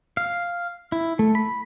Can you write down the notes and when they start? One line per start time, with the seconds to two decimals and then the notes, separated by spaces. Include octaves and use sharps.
0.17 F5
0.92 E4
1.19 A3
1.35 B5